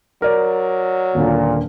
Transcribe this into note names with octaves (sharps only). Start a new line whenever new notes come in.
F#3 A#4 D5
D#1 A#2 D3